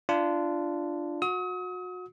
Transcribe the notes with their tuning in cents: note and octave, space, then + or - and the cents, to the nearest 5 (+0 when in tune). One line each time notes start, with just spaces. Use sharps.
D4 +0 F4 -25
F#4 -30 D#6 +40